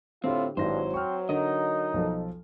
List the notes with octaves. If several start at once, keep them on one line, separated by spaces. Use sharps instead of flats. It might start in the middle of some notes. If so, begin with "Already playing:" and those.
A2 D3 C4 F4 G4
G#1 G2 F#3 E4 C5 A#6
C4 C#6 F6
D3 D#4 A#4 D#5
B1 F3 A4